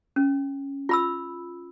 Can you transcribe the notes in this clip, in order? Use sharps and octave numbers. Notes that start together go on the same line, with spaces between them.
C#4
F4 B5 E6